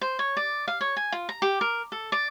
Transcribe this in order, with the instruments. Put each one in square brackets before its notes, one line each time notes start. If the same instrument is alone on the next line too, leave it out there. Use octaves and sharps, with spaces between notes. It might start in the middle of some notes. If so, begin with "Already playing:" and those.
[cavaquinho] C5
C#5
D5
F5
C#5
G#5
F4
A#5
G4
A#4
A4
D5